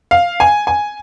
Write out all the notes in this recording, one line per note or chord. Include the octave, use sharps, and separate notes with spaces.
F5
G#5
G#5